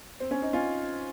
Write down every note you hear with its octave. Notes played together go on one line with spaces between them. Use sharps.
C4
C#4
D#4
C#4 F4